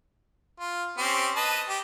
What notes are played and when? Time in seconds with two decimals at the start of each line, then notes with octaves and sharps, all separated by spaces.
0.60 F4
0.98 C4 C#4 G4
1.36 B4 D#5 A5
1.69 G4